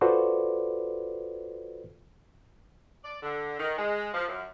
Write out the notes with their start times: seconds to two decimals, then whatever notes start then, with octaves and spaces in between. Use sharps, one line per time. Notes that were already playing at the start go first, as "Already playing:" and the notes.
0.01 F4 F#4 A4 B4 C5 D5
3.04 D5
3.22 D3
3.58 D#3
3.78 G#3
4.13 F3
4.27 F#2